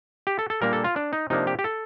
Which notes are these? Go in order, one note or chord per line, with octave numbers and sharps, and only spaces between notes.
G4
A4
A4
A#2 G3 A#3 D4 A#4
A4
F4
D4
D#4
C3 F3 A#3 D4 D#4
G4
G4
A4